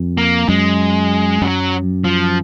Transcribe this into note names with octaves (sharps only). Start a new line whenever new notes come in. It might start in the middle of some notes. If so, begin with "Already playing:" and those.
Already playing: F2
A#3
F#2 G#3
F#2 F#3
F3